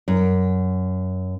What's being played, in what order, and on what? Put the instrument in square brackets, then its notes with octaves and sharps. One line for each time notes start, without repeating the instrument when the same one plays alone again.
[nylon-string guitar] F#2